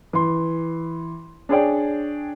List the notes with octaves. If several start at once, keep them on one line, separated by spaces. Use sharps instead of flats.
E3 C6
D4 G#4 C#5 D5 G5